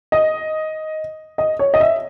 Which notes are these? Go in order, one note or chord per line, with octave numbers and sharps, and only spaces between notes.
D#5
D#5
C#5
D#5
E5